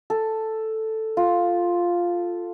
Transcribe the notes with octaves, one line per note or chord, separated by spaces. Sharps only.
A4
F4